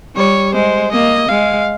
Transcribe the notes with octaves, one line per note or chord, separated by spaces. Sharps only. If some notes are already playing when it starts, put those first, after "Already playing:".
G3 C#5
G#3 C5
A#3 D#5
G#3 F5